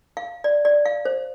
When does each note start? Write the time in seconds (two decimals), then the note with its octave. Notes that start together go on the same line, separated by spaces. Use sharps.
0.17 F5
0.44 D5
0.65 D5
0.86 F5
1.05 C5